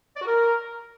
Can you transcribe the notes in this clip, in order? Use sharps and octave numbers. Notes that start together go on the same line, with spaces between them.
D5
F#4
A#4